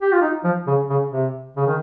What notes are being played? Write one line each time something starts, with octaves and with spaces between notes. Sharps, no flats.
G4
F4
D#4
F3
C#3
C#3
C3
C#3
D#3